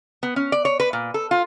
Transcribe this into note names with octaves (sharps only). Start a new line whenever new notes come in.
B3
C#4
D5
C#5
B4
A#2
A4
F4